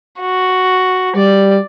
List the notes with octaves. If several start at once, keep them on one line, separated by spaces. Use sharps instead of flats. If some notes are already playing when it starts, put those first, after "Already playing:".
F#4
G3 D5